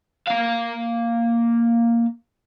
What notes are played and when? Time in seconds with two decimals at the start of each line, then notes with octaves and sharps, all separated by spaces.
0.27 A#3 F5